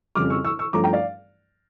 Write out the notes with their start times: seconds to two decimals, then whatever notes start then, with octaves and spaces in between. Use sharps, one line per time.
0.15 F2 C#3 G3 D6 F6
0.30 C#6 E6
0.44 C#6 E6
0.59 C#6 E6
0.73 G2 F3 A3 C#4 A#5 D6
0.83 G5 A#5
0.93 D5 F5